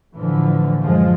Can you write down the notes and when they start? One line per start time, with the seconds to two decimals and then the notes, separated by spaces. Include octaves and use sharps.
0.14 A2 D3 E3 F3
0.81 F#2 F3 G#3